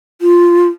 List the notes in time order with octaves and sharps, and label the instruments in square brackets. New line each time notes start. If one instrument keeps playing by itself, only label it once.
[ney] F4